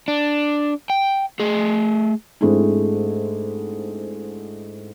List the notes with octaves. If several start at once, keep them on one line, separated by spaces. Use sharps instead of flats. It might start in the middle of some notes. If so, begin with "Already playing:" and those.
D4
G5
A3 G#4
G#2 G#3 A3 C4 D4 E4